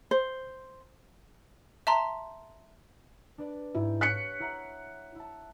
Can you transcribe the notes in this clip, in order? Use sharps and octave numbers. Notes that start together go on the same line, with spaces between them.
C5
E5 A5 A#5 C6
D4 B4 D5
G#2 E4 G4
C#5 F5 A5 F#6 B6 C#7
E4 F#5 A#5
E4 A5